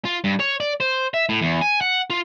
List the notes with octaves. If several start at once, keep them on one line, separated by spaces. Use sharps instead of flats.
F4
G2
C#5
D5
C5
E5
A2
E2
G#5
F#5
F4